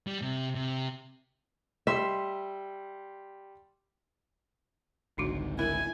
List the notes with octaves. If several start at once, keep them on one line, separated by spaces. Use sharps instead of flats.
G3
C3
C3
G3 E5 C6
G#1 C#2 D3 D4 D#4 F#4
E4 A#4 G#5